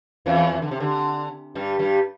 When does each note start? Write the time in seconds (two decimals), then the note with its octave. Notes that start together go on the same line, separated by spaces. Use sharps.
0.26 E2 E3
0.62 D3
0.71 C3
0.80 D3
1.55 G2 G3
1.79 G2 G3